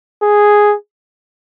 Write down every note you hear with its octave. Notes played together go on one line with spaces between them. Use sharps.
G#4